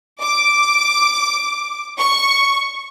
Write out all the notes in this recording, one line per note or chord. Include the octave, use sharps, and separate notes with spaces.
D6
C#6